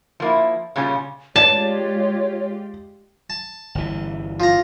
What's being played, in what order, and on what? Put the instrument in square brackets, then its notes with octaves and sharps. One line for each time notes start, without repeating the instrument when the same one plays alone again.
[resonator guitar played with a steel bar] F3 A#3 E4
A#2 C#3 G3 C#4 F4
[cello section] G#3 F4 G4 [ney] C#5 [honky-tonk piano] D5 [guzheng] A5
[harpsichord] A5
[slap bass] G1 E3
[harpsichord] F3 A#5